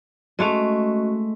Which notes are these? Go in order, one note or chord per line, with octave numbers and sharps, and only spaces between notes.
G#3 A3 C#4 F#4 D#5